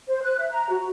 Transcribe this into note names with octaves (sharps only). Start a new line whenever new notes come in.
C5
F#6
E5
A#5
F#4